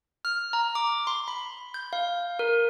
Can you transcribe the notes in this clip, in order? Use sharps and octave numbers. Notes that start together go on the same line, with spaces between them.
F6
A#5
D6
C6
B5
G6
F5
A#4